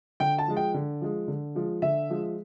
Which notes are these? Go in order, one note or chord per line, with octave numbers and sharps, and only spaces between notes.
D3 G5
A5
F3 G#3
G5
D3
F3 G#3
D3
F3 G#3
D3 E5
F3 G#3